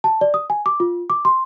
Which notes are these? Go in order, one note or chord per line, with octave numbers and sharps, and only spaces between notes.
A5
D5
D#6
G#5
D6
F4
D6
C6